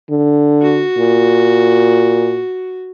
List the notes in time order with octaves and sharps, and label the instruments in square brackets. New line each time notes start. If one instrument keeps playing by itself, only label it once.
[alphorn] D3
[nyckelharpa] F#4
[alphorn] A#2